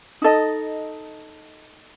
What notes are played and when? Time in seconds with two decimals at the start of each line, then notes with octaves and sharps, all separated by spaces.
0.22 D#4 A4 D#5